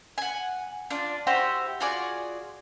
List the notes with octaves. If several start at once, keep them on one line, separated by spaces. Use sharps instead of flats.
F#5 G#5
D4 F4
E4 F#4 G4 C5
F4 F#4 G#4 D5